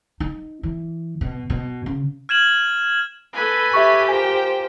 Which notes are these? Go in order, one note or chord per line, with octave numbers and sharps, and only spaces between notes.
D#4
E3
B2
B2
C#3
F6 G#6 E7 F#7
A4 B4 G#5 B5
G4 E5 C#6
F4 A#4 C5 G5 G#5